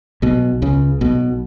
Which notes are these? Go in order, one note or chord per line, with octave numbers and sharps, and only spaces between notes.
B1 B2
C#2 C#3
B1 B2